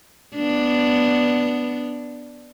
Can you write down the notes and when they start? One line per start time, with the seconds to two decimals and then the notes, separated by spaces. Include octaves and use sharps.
0.36 B3 D4